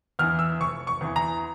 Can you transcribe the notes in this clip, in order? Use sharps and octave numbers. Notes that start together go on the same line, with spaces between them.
E2 E3 F6
E6
F1 C#6
C#6
E2 E3
A#5